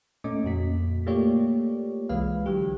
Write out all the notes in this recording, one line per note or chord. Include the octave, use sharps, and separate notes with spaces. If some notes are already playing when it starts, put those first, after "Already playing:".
A#2 A3 C#4 D#5 D6
F2 A#2 F#4 B6
A3 A#3 F4 G4 C#5 D5
C2 E3 G#3 F4 B4 F5
D3 E3 F#3 G4